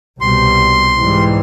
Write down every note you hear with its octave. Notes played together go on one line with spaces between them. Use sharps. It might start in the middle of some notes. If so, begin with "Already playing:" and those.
C2 B2 G3 C6
G#2 E3 G3